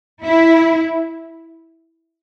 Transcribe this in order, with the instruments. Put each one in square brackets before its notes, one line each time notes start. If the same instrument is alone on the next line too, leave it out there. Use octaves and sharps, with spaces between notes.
[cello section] E4